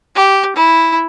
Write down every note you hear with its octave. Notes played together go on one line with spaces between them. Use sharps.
G4
E4